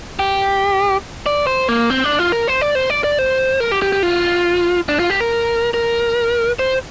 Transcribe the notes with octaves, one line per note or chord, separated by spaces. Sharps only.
G4
D5
C5
A#3
C4
D4
F4
A#4
C5
D5
C5
D5
D5
C5
A#4
G4
G4
G4
F4
D4
F4
G4
A#4
A#4
C5